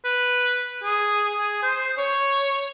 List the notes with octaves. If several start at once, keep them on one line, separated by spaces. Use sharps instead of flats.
B4
G#4
G#4
C5
C#5